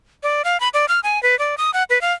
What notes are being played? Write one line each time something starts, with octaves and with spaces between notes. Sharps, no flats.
D5
F5
B5
D5
F6
G#5
B4
D5
D#6
F#5
B4
F5